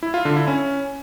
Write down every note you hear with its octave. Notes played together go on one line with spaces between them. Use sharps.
E4
F4
D3
E4
C#4